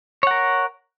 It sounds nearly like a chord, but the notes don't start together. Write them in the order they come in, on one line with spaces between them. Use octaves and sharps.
C#5 F#5 A#4